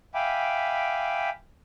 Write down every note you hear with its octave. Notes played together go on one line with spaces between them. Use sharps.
E5 F5 G5 G#5 B5 D6